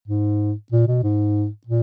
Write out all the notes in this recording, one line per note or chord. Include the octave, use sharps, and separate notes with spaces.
G#2
A#2
B2
G#2
A#2